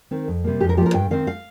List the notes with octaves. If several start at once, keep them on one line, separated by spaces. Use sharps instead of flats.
D#3 C4
F2
C3 G3 A#3
F2 G4
A#4
F3 A#3 G4
A#4
G2 G5
D#3 C4 F5
F5